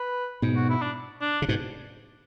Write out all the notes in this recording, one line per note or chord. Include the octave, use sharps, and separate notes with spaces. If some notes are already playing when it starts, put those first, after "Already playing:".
Already playing: B4
G#2 B2
F#4
E4
D4
D4
C#3
G#2 B2